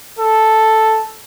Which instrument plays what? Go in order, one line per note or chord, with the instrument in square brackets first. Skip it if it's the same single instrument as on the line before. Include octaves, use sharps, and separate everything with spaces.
[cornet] A4